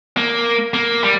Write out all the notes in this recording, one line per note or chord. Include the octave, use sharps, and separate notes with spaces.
A#3
A#3
G3